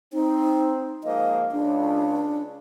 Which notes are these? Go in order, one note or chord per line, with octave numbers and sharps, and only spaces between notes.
C4 D#4
G#2 F3 A#3 D#5
C#2 D4